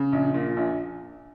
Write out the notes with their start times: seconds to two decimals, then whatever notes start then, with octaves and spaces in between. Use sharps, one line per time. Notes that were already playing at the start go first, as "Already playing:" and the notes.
Already playing: C#3
0.12 A#1
0.34 A#2
0.57 A#1